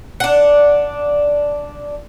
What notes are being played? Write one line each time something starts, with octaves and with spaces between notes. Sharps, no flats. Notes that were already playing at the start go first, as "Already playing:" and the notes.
D4 F#5